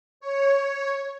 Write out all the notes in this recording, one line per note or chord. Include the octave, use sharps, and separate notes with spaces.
C#5